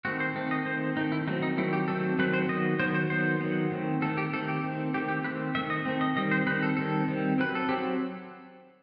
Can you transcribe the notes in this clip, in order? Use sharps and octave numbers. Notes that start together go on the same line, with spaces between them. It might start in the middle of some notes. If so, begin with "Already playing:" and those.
D#3 A3 C4 F#4
C5
D#3 A3 C4
D#5
D#3 A3 C4 C5
D#3 A3 C4 D#4
E4
D#3 F#3 A3 C4 D#4
D#4
D#3 F#3 A3 C4 E4
G4
D#3 F#3 A3 C4 A4
D#3 F#3 A3 C4 B4
C5
D#3 F#3 B3 D#5
D#3 F#3 B3 C5
C5
D#3 F#3 B3 C5
D#3 F#3 B3
D#3 A3 C4
D#3 A3 C4 A4
G4
D#3 A3 C4 A4
G4
D#3 A3 C4
D#3 A3 C4 G4
G4
D#3 A3 C4 B4
D#3 A3 C4 E5
D#5
D#3 A3 C4
D#5
D#3 G3 C4 D#5
C5
D#3 G3 C4 B4
A4
D#3 G3 C4 A4
D#3 G3 C4
F#3 C4 B4
A4
F#3 C4 G4